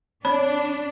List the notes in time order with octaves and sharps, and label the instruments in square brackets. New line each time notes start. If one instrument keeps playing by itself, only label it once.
[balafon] C4 C#5 B5 [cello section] D4